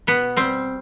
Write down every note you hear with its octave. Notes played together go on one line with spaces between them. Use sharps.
B2 B3
G3 C4